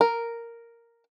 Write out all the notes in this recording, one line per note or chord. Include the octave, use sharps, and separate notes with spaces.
A#4